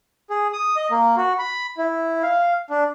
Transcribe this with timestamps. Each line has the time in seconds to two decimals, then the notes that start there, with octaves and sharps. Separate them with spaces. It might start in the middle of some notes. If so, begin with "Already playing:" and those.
0.30 G#4
0.53 D#6
0.76 D#5
0.91 A#3
1.17 F#4
1.39 B5
1.78 E4
2.23 F5
2.70 D4